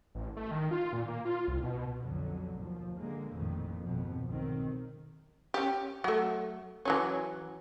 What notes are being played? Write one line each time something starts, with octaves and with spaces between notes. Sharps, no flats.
A1
A3
D#3
F4
A#2
A#3
F4
C2
B2
B1 F2 D3 F#3
D#2 F3
D3 G#3 A#3
A1 F2 A#2 D#3
G#1 F2 B2
B1 D#3 C4
C#4 G4
F#3 A3
E3 F#3 C#4